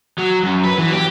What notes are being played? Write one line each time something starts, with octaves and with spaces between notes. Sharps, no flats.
F#3
F#2
B4
E3
G4